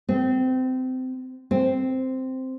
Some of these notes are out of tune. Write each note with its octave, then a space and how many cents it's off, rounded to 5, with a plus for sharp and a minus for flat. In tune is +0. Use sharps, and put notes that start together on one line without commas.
C4 -25
C4 -5